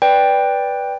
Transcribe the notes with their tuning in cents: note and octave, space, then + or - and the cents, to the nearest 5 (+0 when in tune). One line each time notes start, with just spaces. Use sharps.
B4 +0 D5 -5 G5 +10